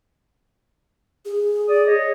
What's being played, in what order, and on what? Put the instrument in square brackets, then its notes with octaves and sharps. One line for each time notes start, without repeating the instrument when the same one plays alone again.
[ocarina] G#4
[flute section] D5 D#6
C#5 D#5